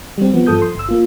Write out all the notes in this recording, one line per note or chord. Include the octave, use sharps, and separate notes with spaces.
G3 C4
F3 B3
G2 F3 A4 D#6 G6
C6
G1 E6
A#3 F4